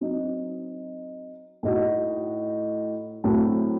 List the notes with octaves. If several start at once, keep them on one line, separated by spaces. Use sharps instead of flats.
F#3 C4 D#4
A2 A3 D#4 F#4
A2 F#3 A3 C4